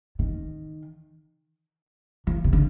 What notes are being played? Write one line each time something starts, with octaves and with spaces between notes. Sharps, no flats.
D#3
F3
C3
D3